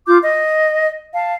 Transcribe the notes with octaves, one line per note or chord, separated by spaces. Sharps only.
F4 D6 G6
D#5
F5 A5